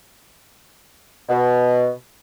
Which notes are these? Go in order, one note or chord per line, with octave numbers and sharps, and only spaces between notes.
B2